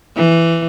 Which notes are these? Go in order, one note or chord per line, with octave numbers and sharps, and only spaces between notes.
E3